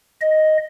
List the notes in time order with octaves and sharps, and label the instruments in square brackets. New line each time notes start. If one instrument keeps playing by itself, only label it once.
[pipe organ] D#5